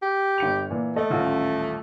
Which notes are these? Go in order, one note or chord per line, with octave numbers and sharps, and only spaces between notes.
G4
G1 C#7 F7
A#2 E3
A3 A4 D#5
D#1 A1 F4